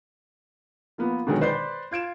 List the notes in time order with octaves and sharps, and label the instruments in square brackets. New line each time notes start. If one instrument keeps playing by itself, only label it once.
[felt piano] F3 A#3 B3
B2 D3 D#3 F#3 G#3 D#4
B4 C5 D5 C6 G6
F4 G#6 D7 E7